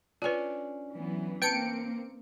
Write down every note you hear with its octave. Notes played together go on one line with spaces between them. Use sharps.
C#4 D4 F4 B4
E3 F#3 B3
A#3 C4 B4 G5 A5 C#7 D7